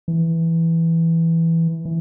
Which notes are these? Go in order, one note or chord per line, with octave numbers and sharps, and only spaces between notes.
E3
E3